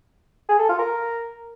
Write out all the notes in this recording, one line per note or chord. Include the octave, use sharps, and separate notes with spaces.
G#4
A4
F4
A#4